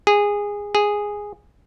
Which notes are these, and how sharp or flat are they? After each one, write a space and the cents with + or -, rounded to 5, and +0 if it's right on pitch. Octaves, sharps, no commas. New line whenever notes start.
G#4 -15
G#4 -5